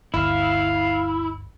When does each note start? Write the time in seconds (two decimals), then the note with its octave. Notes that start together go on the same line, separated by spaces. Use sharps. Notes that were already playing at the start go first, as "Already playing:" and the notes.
0.14 G1 D2 E4 F5